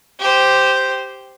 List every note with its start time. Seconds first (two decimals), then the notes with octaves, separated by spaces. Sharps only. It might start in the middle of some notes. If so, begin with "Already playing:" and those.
0.19 G4 C5